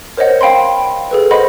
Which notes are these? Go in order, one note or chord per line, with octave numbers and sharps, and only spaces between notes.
A#4 C5 C#5 D#5 F#5
F5 G5 B5 C6
G#4 A4 B4
C5 D#5 F#5 B5 C6